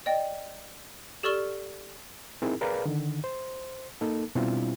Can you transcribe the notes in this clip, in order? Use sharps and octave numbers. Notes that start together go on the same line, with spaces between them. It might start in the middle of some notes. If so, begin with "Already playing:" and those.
D5 D#5 G5
G4 A4 D5 C#6 F6 G7
C4 D#4 E4 G#4 A#4
G#4 A#4 B4 D5 F5 A#5
D3 D#3
C5
A#3 D#4 A4
B2 G3 C4 D4 E4 F4